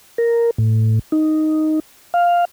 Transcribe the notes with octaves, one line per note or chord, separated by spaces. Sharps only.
A#4
A2
D#4
F5